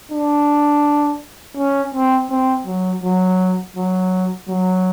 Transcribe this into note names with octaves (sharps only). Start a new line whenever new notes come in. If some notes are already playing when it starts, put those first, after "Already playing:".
D4
C#4
C4
C4
F#3
F#3
F#3
F#3